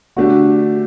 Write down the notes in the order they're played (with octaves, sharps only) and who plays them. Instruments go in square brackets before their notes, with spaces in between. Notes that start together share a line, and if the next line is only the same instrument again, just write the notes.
[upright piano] D3 A3 D4 G4 [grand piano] F#4